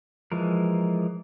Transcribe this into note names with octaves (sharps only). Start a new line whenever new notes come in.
E3 F3 G#3 A#4